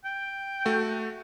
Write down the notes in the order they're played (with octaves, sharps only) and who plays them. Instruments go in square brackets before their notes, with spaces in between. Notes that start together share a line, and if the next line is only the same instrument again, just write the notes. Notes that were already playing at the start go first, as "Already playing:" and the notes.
[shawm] G5
[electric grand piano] A3 F#4